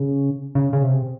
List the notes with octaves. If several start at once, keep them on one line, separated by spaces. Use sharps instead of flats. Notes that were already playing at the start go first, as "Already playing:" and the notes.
Already playing: C#3
C#3
C#3
C3